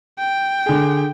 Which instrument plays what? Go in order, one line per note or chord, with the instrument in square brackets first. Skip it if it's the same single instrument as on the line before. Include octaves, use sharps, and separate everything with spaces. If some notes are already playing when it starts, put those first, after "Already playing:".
[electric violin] G5
[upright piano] D3 G#4